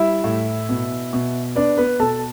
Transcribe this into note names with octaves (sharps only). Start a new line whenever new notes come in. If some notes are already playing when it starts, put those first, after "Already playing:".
Already playing: G3 E4 E5
A2
B2
B2
B3 D4 D5
B3 B4
B2 A4 A5